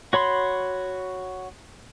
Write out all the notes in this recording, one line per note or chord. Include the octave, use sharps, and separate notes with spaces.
F#4 C#5 B5 C6